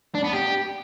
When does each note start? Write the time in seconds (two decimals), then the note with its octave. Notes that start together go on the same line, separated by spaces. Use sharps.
0.15 D4
0.24 B3
0.33 G4